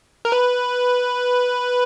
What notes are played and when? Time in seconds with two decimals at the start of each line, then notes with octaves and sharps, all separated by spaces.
0.25 A#4
0.32 B4